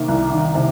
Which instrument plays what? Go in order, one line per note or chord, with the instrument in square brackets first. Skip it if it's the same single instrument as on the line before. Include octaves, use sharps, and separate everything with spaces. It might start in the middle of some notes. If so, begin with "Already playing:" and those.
Already playing: [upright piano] C3 D#3 A#3
C2
D#3
C3